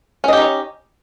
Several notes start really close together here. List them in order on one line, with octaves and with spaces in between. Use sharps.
C#4 D#5 G4 D#4 C#5